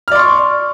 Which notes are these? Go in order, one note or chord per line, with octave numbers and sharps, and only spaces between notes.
D5 C6 C#6 F6